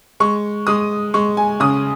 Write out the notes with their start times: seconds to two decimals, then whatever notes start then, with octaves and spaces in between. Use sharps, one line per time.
0.20 G#3 C#6
0.67 G#3 D#6
1.14 G#3 C#6
1.37 G#5
1.60 C#3 D#6